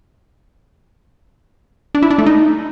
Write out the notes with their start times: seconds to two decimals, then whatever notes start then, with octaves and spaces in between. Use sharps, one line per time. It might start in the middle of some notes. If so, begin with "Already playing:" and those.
1.95 D4
2.03 E4
2.10 D4
2.18 A3
2.26 D#4